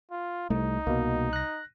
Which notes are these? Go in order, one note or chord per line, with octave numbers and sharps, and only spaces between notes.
F4
C2 A3 D#4
C2 B2 A#3
F#6 A#6